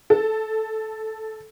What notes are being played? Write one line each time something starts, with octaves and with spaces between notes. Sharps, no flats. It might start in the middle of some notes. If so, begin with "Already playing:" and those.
A4